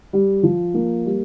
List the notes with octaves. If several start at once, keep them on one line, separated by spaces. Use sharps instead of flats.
G3
F3
A#3
G3